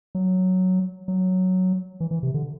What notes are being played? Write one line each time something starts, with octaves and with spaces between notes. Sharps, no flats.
F#3
F#3
E3
E3
C3
D3